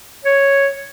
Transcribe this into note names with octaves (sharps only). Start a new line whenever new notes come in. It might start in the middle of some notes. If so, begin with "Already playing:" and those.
C#5